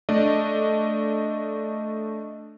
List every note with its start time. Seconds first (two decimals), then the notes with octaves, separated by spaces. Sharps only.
0.09 A3 D4 D5 D#5